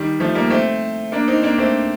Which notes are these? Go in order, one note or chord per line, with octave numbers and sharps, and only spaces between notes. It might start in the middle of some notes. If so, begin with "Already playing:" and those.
Already playing: D#3 G3
F3 A3
G3 A#3
A3 C4
A#3 D4
C4 D#4
A#3 D4
A3 C4